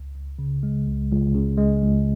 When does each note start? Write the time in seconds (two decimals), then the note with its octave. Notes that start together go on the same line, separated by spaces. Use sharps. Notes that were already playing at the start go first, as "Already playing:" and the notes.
Already playing: C#2
0.15 C#2
0.39 C#3
0.63 G#3
0.87 C#2
1.11 C#2
1.35 C#3
1.58 G#3
1.82 C#2